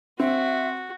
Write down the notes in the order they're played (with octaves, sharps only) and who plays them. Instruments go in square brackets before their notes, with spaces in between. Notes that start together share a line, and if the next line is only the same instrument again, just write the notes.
[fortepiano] C4 [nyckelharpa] F#4 [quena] E5